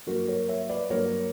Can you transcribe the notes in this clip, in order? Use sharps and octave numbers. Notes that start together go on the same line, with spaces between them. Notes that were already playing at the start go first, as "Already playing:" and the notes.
G2 F#3 A#3 F#4 A#4
A#4 C#5
C#5 E5
B4 D5
G2 F#3 A#3 A#4 C#5